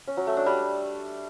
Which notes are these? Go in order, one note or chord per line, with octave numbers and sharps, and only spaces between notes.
C#4
F#3
A3
D4
G3